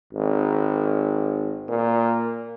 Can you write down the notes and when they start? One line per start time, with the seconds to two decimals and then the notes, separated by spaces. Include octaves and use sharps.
0.13 G#1
1.69 A#2